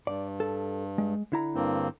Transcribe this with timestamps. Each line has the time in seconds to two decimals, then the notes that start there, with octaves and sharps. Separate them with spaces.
0.07 G2 D5
0.40 A4
0.98 G#3
1.32 D3 E4 A#5
1.55 G2 A#3 C4